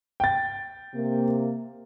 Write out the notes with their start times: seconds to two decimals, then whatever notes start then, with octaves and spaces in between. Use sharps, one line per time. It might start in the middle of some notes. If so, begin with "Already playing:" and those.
0.20 G5 A6
0.94 C3 A#3